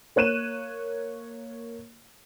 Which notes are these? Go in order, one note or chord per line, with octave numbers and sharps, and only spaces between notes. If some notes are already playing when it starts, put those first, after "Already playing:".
A#3 C#5 F#6 D#7 E7